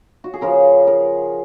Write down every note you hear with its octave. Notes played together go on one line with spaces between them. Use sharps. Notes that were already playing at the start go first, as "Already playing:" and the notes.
F#4
G#4
C#3 F3 A#4
A#4